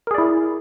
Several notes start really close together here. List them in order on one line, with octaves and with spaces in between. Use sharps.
A#4 G#4 D5 E4